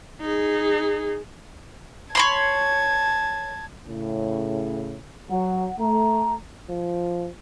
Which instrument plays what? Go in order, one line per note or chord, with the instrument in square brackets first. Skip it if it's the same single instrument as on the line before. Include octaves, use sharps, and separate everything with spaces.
[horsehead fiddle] D#4 G#4
[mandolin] C#5 B5 C6 [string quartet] A5 G#6
[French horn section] A2 C#3
[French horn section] F#3 [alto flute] F#5
[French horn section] A3 [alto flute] A#5
[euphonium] F3